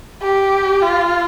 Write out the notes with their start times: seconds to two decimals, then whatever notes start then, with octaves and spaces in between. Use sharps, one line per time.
0.22 G4
0.82 F4